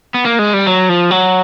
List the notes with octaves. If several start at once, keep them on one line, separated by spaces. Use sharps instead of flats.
B3
A#3
G#3
G3
F#3
F3
F#3